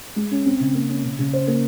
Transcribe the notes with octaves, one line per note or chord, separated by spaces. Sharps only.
G#3
C#4
C4
C#3
A#3
C#4
C#3
C#3
C5
A#3